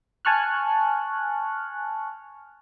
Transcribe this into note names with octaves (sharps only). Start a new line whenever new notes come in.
G#5 A5 C#6 F6 F#6